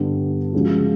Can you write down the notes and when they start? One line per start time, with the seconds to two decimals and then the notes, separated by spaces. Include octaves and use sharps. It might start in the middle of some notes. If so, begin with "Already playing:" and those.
Already playing: G2 D3 G3 B3
0.53 C#3 F3 G#3 C#4 F#4